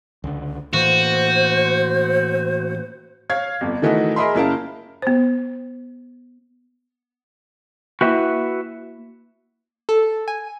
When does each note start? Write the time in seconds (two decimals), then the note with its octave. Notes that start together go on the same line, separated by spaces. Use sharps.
0.24 C#2 D3
0.73 A2 E3 A#3 F#4 C5
3.29 C#5 F5 G#6
3.61 G1 F2
3.82 D#3 E3 A3 E4 F#4 D#5
4.16 G#4 A#4 D#5 E5 B5 C6
4.35 F#1 C#4 E4 A#4 F5 A5
5.02 B3 C5
8.01 A#3 E4 F#4 B4 E5
9.89 A4
10.28 G#5